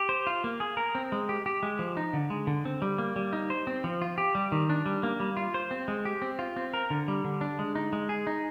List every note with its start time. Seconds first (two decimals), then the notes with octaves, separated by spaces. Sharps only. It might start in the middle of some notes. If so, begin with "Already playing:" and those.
Already playing: G4
0.09 C5
0.27 F4
0.44 A#3
0.60 G#4
0.77 A#4
0.95 C4
1.12 G#3
1.29 G4
1.46 G4
1.63 G#3
1.79 F3
1.97 D#4
2.13 D3
2.30 G#3
2.47 D3
2.65 C4
2.82 G3
2.98 A#3
3.16 G3
3.33 D#4
3.50 C5
3.67 C4
3.84 F3
4.02 F4
4.18 G4
4.35 G3
4.52 D#3
4.70 D4
4.86 G3
5.03 A#3
5.20 G3
5.37 F4
5.54 C5
5.71 C4
5.88 G#3
6.05 G4
6.22 C4
6.39 F4
6.56 C4
6.74 A#4
6.90 D3
7.08 G3
7.24 D3
7.41 D4
7.59 G#3
7.75 D#4
7.93 G#3
8.09 G#4
8.27 D#4